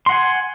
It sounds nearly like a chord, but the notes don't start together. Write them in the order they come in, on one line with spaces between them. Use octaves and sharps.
C6 F#5 G#5